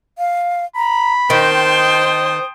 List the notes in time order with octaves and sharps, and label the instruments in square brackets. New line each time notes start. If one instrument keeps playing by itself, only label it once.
[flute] F5
[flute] A#5 [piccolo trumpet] B5
[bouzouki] D#3 [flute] C5 [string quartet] G5 A5 C6
[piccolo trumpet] D#6